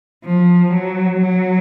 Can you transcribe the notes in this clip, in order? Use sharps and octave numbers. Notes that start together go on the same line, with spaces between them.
F3
F#3
F#3